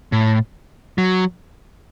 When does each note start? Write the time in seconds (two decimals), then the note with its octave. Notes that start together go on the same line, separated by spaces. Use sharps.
0.12 A2
0.98 F#3